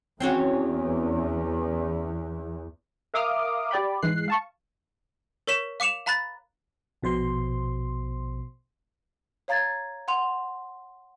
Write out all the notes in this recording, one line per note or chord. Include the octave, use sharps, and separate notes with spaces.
E2 C4 C#4 F#4
A#4 E5 F5 D6 D#6 F6
G4 D5 G5 B5
G#2 E3 G#3 F#6 C7
F5 A5 C#6
A#4 C#5 C#6 B6 E7
F5 D6 C#7 E7 F7
F5 A#5 B5 F#6 A6
A#1 B2 C5 C6
C#5 F5 A#5 G#6 A6
F#5 C6 F7